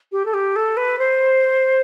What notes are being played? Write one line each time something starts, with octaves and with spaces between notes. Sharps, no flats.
G4
A4
G4
A4
B4
C5